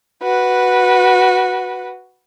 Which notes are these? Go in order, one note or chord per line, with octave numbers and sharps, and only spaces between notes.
F#4 B4